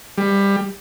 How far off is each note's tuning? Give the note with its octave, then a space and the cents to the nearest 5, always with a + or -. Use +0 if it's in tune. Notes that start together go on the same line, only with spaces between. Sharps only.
G3 +20